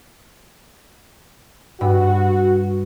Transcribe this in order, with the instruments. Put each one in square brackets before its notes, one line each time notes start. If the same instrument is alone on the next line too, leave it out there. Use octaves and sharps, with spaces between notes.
[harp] G2 [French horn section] F#4